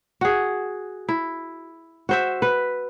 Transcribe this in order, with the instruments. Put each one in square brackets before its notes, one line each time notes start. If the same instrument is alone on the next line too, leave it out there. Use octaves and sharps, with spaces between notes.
[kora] F#4 G#4
E4
F#4 C5 E5
B4